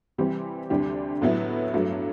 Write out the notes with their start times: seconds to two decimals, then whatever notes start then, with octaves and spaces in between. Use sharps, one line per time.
0.18 C3 E3 G3 C4 G4
0.70 D2 C3 G3 D4 G4
1.22 A2 F#3 B3 E4
1.73 G2 F#3 A3